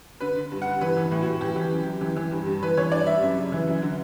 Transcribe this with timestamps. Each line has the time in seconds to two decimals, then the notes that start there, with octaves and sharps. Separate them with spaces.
0.20 D3 B4
0.36 D3
0.52 G2
0.62 F#5
0.67 G2
0.81 E3 B4
0.97 E3
1.11 A2
1.22 A2 F#4
1.41 E3 G4
1.56 E3
1.71 F#2
1.86 F#2
2.01 E3
2.17 E3
2.32 G2
2.47 G2
2.63 E3 B4
2.77 E3 C#5
2.92 G2 D5
3.07 G2 E5
3.22 F#2
3.38 C#3
3.52 E3
3.67 F#2
3.82 D3